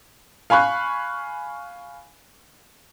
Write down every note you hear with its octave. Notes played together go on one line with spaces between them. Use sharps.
F5 G#5 B5 C#6 F#6